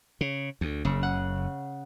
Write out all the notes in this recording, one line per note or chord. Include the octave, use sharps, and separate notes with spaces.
C#3
D2
F#1 C#3
F#5